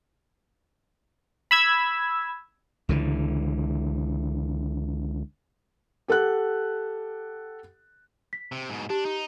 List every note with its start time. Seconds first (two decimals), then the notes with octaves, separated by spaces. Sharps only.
1.51 B5 E6 G#6
2.89 C#2 D3 E3
6.08 G4 A4 F#5 F#6
8.33 B6
8.52 C3
8.70 G#2 B2
8.90 D4 G4
9.05 D#4